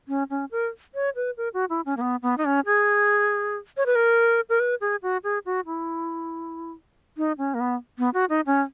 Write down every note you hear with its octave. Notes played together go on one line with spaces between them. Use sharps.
C#4
C#4
A#4
C#5
B4
A#4
F#4
E4
C#4
A#3
B3
B3
D#4
C#4
G#4
C#5
B4
A#4
A#4
B4
G#4
F#4
G#4
F#4
E4
D#4
C#4
A#3
B3
B3
F#4
D#4
C#4